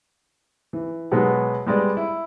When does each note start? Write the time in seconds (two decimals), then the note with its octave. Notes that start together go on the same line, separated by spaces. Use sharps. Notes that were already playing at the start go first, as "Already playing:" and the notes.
0.73 E3
1.12 B2 F#3 G#3 B3
1.67 G3 G#3 B3 D5
1.97 E4